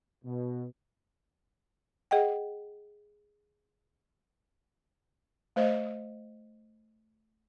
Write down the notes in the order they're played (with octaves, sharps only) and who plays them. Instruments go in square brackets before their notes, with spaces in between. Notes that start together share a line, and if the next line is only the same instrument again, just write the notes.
[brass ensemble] B2
[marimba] G#4 D#5 F#5 G5
[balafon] A3 C5 D#5